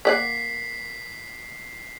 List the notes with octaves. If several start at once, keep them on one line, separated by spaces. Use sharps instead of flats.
A#3 D5 F#5 B6 C7